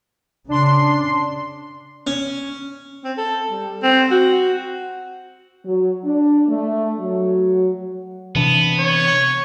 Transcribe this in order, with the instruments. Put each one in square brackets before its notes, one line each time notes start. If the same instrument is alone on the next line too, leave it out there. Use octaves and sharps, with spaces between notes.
[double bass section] C#3 [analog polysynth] D4 C6
[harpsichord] C#4
[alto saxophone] C4
A4
G3
C4
F#4
[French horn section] F#3
D4
A3
F#3
[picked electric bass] C3 E3 D4 [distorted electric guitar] B3
[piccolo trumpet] C#5